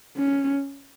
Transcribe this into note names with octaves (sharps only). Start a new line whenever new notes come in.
C#4